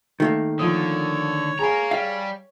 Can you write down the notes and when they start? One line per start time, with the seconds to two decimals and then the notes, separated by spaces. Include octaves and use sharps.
0.20 D#3 A3 A#3
0.59 D3 F3 C#5 D#6
1.59 G#4 F5 G#5 A#5 B5
1.91 G3 F5